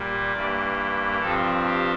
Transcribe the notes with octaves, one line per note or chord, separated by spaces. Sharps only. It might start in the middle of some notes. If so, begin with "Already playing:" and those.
Already playing: A#2 G3 A#3
G2 E3 A#3 D5
G2 F3 C4 A4
G4